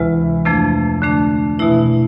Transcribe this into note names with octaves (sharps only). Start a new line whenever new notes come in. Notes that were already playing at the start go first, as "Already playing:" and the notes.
Already playing: D2 C3 E3 G#3
F2 C3 F3 A3 D4
D3 A3 D4
B2 E3 A3 E4